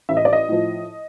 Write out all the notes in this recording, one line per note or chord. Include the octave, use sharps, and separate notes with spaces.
A1 E5
D#5
D5
D#5
A2 F3